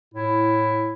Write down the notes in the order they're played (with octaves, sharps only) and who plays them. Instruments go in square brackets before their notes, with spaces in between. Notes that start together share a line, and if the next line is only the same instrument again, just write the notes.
[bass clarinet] A2 [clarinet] E4